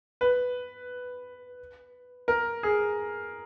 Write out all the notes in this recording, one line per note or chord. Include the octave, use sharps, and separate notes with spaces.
B4
A#4
G#4